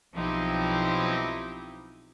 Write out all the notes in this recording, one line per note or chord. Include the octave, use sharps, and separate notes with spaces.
B1 F3 C4 D#4 E4 G4